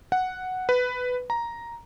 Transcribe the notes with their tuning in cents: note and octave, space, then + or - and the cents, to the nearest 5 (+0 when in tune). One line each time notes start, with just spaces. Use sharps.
F#5 +0
B4 +10
A#5 +5